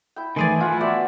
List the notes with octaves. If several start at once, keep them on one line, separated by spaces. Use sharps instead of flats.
E4 G5
D#3 E3 A3 G#4 C5 D5 G#5 A5
E4 F4 F#5
B3 F#4 D5 E5 G5